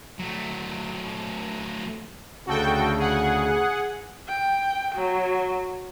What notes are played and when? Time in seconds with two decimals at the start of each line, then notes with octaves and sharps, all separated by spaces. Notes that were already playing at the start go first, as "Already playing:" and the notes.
0.19 F#3 A3
2.47 D2 C#3 F#4 A4 G5
2.99 G#4 F#5
4.29 G5
4.95 F#3